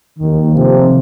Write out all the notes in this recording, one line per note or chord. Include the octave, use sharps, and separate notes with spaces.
D#2 D#3
F2 C3 F3